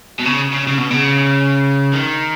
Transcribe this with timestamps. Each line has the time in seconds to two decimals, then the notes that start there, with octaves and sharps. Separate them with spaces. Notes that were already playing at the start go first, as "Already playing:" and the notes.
0.19 B2
0.25 C#3
0.53 C#3
0.68 C#3
0.78 B2
0.91 C#3
1.94 D#3